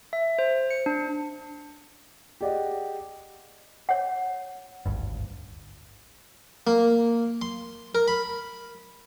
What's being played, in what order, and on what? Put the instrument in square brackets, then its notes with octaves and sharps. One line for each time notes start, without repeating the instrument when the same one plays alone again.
[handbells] E5
C5
C#7
D4
[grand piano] G4 G#4 D5 D#5 F#5
[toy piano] C#5 F#5
[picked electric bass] G#1 D2 G2
[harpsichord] A#3
C6
A#4
B5